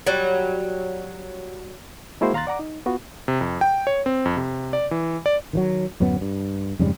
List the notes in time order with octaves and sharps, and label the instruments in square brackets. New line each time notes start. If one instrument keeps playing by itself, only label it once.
[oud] F#3 G3
[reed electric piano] G#3 A#3 E4 F#4 G#4 C5
D#2 F5 A#5 C6 F#6 A6
D5 F#5 A#5 D6
D#4
B3 F4 F#4
[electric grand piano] C3
F2
G5
C#5
C4
F2
C3
D5
E3
D5
[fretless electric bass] D#3 E3 F#3
D1 F#2 F#3 B3
G2
F2 G#2 C#3 G3